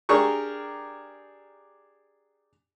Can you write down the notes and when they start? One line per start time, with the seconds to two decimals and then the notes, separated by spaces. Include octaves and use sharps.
0.09 D4 G4 G#4 A#4 C#6